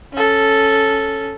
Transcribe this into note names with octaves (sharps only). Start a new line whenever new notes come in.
C#4 A4